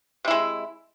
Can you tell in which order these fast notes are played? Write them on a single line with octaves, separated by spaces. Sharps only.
C3 E4 G#3